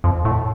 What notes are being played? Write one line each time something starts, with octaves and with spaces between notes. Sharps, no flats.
F2
A2